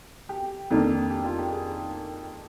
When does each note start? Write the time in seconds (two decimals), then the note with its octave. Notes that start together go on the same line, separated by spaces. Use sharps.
0.29 G4
0.70 F2 D#3 A#3 D4
1.10 G4
1.25 F4
1.38 G4
1.52 G#4